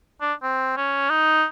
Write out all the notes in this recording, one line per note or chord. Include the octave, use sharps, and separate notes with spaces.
D4
C4
C#4
D#4